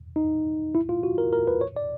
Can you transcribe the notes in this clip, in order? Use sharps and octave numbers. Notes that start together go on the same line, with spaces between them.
D#4
E4
F4
F#4
A#4
A#4
B4
C#5
D5